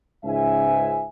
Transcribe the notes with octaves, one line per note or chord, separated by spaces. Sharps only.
C#2 G#2 E5 G#5